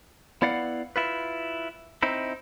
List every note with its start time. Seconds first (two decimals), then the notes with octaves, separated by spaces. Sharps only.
0.42 B3 E4 D5 F5 F#5
0.96 E4 F4 B4
2.03 C4 D#4 E4